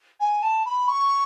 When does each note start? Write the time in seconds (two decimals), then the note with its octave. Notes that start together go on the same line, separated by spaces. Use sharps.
0.20 G#5
0.42 A5
0.65 B5
0.88 C#6